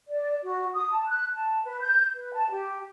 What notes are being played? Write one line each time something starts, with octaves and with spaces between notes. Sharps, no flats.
D5
F#4
D#6
A5
F#6
A5
B4
G6
B4
A5
G4